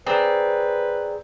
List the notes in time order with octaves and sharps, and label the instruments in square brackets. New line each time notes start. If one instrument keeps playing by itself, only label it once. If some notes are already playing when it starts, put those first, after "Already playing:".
[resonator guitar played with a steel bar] C4 [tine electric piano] G#4 D5 A#5 [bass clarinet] B4